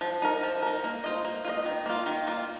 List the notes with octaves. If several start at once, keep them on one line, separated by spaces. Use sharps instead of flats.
F3
D#4 A#4
F3
D#4 A#4
A#3
F4 C5 D#5
A#3
F4 C5 D#5
D#3
A#3 F4
D#3
A#3 F4